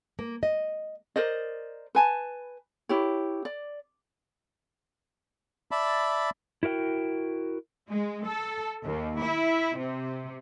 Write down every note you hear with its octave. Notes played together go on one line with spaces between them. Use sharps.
A#3
D#5
A#4 C5 D5 D#5
B4 G#5 A5
E4 G4 C#5
D5
D5 E5 A5 B5
E4 F#4 A#4 F5 G5
G#3
A4
D#2
E4
C3